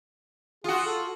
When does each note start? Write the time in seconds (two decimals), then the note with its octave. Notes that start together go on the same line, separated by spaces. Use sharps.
0.64 F4 F#4 G#4
0.86 A4